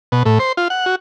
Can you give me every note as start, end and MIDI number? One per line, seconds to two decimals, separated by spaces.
0.12 0.23 47
0.26 0.38 45
0.39 0.52 72
0.57 0.68 65
0.70 0.86 78
0.86 0.95 66